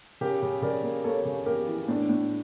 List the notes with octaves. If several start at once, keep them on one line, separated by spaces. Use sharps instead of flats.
C#3 G4 A#4
C#3
C#3 A#4 D5
A#3
A#3 A4 C#5
C#3
A#3 G4 A#4
E3
A2 D4
A2